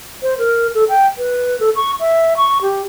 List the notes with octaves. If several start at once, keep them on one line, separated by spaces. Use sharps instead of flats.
C5
A#4
A4
G5
B4
A4
C#6
E5
C#6
G4